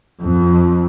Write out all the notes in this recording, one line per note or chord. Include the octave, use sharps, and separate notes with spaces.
F2